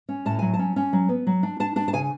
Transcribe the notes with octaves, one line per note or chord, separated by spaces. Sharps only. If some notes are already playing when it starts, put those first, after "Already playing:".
C#4
A2 A5
F#3 G#5
A5
C#4
C#4
F#3
B3
F#3
D4
D4 A5
D4 A5
A5
C#3 G#5